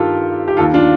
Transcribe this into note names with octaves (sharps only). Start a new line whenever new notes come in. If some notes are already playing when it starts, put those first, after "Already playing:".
Already playing: G2 D#3 F4 G4 A4 A#4
G4
D#2 D#3 F4 A4
D4 F4